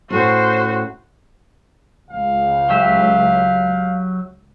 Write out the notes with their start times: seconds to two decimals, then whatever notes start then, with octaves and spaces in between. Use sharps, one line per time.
0.10 A2 C#4 F#4 C5 C6
2.10 C#2 F5
2.69 F#3 G4 E5